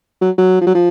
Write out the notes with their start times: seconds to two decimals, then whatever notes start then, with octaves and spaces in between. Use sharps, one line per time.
0.21 F#3
0.38 F#3
0.61 F3
0.67 F#3
0.74 F3